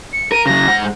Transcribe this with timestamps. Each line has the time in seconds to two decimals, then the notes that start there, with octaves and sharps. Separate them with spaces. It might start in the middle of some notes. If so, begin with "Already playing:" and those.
0.13 C#7
0.32 A#4 D#7
0.46 C#3 F#3 A#6
0.68 G#2 F#5